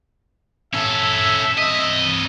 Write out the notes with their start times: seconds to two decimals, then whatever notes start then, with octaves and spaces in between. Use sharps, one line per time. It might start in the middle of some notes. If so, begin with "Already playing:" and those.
0.74 C#4 A4 E5
1.58 C4 D#5